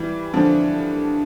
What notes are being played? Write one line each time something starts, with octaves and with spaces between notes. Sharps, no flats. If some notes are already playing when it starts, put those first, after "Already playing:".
Already playing: E3 G3
D3 F3